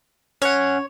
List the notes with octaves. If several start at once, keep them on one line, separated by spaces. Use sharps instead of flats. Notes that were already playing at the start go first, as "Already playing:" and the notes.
C#4 C#5 F#5